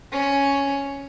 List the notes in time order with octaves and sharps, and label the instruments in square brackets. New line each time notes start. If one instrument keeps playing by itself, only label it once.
[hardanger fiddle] C#4